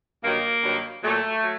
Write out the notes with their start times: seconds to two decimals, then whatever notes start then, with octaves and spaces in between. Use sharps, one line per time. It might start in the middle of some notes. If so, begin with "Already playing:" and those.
0.23 G2 D#3 F#3 A#3
0.63 G2 D#3 F#3
1.03 A#2 F#3 A3
1.43 F#3